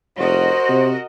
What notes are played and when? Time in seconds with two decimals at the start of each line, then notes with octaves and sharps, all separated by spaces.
0.19 F1 F#4 A#4 C5 D#5
0.69 C3